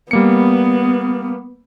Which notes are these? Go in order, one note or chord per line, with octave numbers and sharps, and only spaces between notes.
G3 A#3 B3 C#7